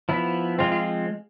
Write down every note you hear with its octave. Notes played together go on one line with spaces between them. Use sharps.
F3 B3 E4
F3 G#3 C4 F4
F4